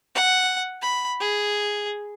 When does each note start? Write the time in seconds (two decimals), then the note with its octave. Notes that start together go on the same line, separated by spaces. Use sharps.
0.15 F#5
0.82 B5
1.20 G#4